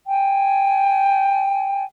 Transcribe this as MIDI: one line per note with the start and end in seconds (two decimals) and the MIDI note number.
0.06 1.84 79
0.06 1.84 80